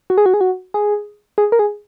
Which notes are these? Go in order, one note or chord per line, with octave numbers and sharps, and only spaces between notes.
F#4
G#4
F#4
G#4
F#4
G#4
G#4
A#4
G#4